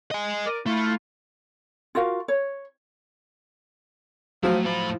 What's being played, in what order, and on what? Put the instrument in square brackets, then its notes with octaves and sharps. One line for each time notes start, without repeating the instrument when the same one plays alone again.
[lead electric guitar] D#5 G#5
[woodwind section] A#4 D5
[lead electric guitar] A3 [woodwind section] E4 F4
[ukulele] F4 F#4 A#4 F5
C#5
[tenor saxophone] F3 [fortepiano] F#3 [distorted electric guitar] A3 E4
[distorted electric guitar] A2 B5 [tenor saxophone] F3